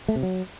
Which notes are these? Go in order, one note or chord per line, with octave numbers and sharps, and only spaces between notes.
A3
C3
F#3